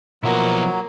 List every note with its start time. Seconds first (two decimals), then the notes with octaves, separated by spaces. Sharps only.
0.23 B1 F3 F#3 A#3 B3 E4